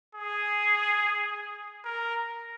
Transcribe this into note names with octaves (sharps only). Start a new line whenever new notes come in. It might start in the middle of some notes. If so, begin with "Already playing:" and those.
G#4
A#4